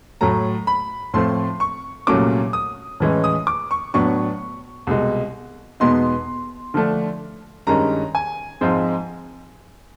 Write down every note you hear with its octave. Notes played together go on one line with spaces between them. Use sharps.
A2 F#3 A3 A#5
B5
A2 F3 A3 C4 C6
C#6
C2 A#2 F#3 A3 C#4 D6
D#6
A2 E3 G#3 C#4
D#6
D6
C#6
A2 F#3 B3 D4 C#6
C2 B2 G#3
E2 B2 G#3 B3 D#4 C6
D3 F3 A3 D4
G2 D#3 G#3 C#4 A#5
G#5
G#2 F3 G#3 C4